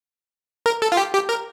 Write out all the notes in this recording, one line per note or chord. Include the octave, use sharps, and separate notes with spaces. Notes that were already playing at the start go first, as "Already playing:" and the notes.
A#4
A4
F4
G4
G4
A#4